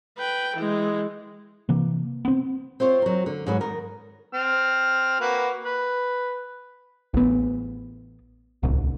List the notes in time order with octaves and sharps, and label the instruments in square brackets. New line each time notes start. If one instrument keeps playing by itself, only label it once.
[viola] B4 G5
E3 G#3
[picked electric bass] C3 E3 A#3
B3 C4
[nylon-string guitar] C4 F4 C5 C#5
F#3 A#4
D3
G#2 F#3 B4
D#3 A#4
[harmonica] C4 F6
A#3 F#4 B4
B4
[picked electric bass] A1 B3
D1 C2